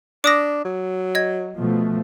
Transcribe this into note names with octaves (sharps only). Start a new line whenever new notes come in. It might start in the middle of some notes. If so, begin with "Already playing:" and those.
D4 D6 D#6 A#6
F#3
D#5 G#6
B2 F3 A3